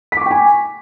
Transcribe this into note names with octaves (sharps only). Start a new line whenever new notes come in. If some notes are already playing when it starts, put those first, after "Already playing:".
G5 G#5 C#6 D6 B6